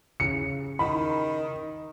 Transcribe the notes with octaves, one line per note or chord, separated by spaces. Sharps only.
C#3 C#7
D#3 B5